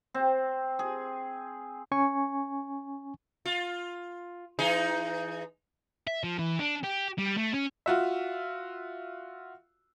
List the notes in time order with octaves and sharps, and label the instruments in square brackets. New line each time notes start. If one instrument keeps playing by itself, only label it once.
[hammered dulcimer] C4
G#4
[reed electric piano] C#4 G#5 C#6
[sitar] F4
E3 D#4 G#4
[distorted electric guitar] E5
F3
E3
D4
G4
G3
A3
C#4
[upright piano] F4 F#4 E5